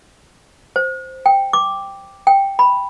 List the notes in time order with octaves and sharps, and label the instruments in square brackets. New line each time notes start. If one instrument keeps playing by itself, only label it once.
[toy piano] C5
G5
D6
G5
B5